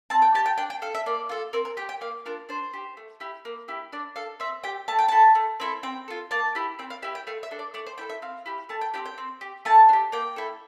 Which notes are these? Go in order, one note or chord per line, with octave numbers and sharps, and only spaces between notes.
C4 A5
G5
G4 A5
G5
D4 G5
G5
A4 F5
E5
A#3 D5
F4 A4
C4 A#4
A#4
G4 G5
G5
A#3 F5
D4 F4 A#4
D4 C5
G4
A3
E4 G4
A#3
E4 G4
D4 D5
A4 F5
C4 E5
G4 G5
A3 A5
G5
E4 A4 A5
A3
C4 E4 A4
C4 G5
F4 A4
A#3 A5
E4 G4
C4 G5
F5
E4 G4 E5
G5
A3 F5
E5
D4 A4
D5
A3 D5
C5
E4 A4 G5
E5
C4 F5
E4 G4
A3 A5
G5
C4 E4 G4 G5
G5
C4
G4
A3 A5
D4
G4
A#3 G5
E4 A4